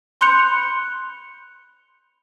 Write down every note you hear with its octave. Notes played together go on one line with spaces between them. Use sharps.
B5 C6 F#6 G6 C#7 F7